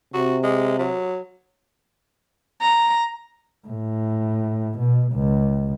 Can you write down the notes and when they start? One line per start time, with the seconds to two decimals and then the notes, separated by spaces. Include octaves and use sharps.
0.14 C3 F#4
0.44 G#3
0.79 F#3
2.62 A#5
3.68 A2
4.78 B2
5.13 C#2